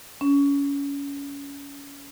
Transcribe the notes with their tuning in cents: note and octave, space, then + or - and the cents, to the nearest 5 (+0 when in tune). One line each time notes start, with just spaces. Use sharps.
C#4 +25